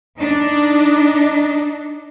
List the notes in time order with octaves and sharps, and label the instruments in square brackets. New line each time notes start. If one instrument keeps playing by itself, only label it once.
[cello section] D4 D#4